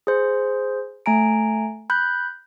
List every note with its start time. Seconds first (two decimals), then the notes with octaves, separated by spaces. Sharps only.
0.07 G#4 C5
1.06 A3 G#5 A#5 D7
1.90 B5 F#6 G6